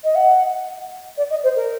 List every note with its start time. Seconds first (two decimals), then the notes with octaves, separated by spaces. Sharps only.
0.03 D#5
0.15 F#5
1.17 D5
1.30 D#5
1.43 C5
1.55 A#4